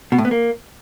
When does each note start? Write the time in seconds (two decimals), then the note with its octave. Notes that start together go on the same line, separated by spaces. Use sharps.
0.12 B2
0.18 A2
0.25 B3
0.31 A#3